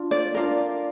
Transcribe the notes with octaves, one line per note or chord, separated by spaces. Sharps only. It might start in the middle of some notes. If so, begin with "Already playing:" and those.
Already playing: D4 F4
D5
D4 F4 A#4